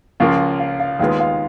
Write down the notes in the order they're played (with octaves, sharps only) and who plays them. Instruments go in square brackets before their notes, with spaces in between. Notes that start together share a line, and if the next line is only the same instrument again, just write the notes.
[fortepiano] C#2 C#3 F3 A#3 [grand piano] F5
[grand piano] F5
F5
[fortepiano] D#2 D#3 G#3 B3 F4 [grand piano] F5
[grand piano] F5